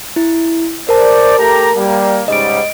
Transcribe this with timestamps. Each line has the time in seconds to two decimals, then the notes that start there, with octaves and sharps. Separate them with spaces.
0.16 E4
0.89 A#4 C5 D5 A5
1.38 A3 G4 A#5
1.76 G3 A#3
2.28 G#2 C#3 G3 D#5 D7